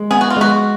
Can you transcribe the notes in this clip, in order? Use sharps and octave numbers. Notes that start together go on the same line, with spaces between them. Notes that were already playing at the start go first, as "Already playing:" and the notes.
Already playing: G#3
B3 G#4
F#4
F4
G#3 F#4